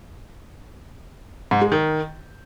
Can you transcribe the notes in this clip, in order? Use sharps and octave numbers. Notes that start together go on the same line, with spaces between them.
G#2
G#3
D#3